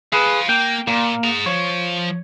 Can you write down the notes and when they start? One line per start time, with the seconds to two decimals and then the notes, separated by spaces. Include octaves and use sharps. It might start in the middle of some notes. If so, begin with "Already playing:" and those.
0.13 G#4 B4 F5 A5
0.49 A#3 G5
0.87 A#2 A#3
1.24 G#4 A#5
1.46 F3 C#5